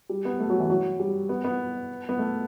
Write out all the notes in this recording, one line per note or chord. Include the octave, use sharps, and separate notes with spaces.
G3
B3
A3
F#3
E3
F#3
G3
B3
B3
B3
A3